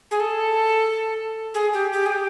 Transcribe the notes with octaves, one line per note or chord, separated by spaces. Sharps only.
G#4
A4
G#4
G4
G4
G#4
G4